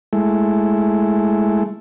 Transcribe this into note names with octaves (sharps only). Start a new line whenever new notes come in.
G#3 A3 E4